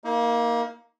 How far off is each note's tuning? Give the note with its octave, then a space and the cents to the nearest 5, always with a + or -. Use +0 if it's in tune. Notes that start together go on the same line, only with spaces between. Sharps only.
A#3 +5 D#4 +35